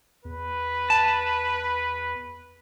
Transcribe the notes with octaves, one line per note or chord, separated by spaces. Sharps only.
E2 B4
A5